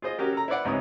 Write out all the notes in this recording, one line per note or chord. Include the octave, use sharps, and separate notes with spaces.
F4 G#4 C5 D#5
C#4 F#4 G4 A#4
A4 A#5
E4 B4 C5 D5 F#5
C#2 G#2 C3 E3 C#5 D#6